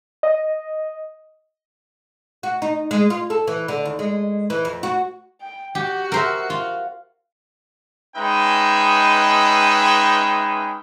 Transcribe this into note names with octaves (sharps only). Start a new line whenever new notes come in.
D#5
F#4
D#4
G#3
F4
A4
E3
D3
D#2
G#3
E3
F2
F#4
G5
F#4 G4
A#4 C5 E5
F4
G#3 C#4 D#4 B4 E5 G5